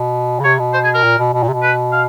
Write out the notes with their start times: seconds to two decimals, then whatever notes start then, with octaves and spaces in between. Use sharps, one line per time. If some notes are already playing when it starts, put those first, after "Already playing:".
Already playing: B2
0.40 C#3
0.44 C3 C#5
0.59 B2
0.73 C5
0.84 G#4
0.94 A#4
1.04 A#2
1.19 B2
1.33 B2
1.43 A#2
1.48 C3
1.53 B2
1.62 B4
1.92 F5